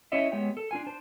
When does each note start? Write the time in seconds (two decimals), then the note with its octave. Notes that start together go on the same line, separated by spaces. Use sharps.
0.12 C#4 E4 C#5 D#5 E5
0.32 G#3 B3 G4 C#5 G5
0.57 A4
0.71 D4 F4 G#5
0.86 D4 C5 A5